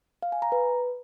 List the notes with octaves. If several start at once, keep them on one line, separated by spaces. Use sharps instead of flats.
F5
G#5
A#5
B4